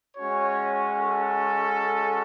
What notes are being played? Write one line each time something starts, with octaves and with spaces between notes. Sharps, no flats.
G#3 C#4 F#4 C#5
A4